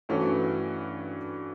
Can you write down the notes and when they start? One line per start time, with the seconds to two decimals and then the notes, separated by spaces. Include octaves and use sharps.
0.09 G2 E3 A3 C#4 F#4